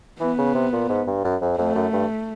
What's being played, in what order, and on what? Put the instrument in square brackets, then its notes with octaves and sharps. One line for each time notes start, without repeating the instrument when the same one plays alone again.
[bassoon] E3 [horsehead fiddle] B3
[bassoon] C#3
C3
A#2
G#2
G2
F#2
F2
[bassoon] F2 [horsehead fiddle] A3
[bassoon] F#2
G2